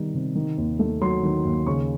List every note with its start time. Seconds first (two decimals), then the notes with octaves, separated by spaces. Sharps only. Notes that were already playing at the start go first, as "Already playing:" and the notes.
Already playing: C3 D#3 G3 B3
0.14 C3
0.35 D#3
0.58 D#2
0.79 A3
1.01 F#3 C6
1.23 D#3
1.44 D#2
1.66 C#3 C#6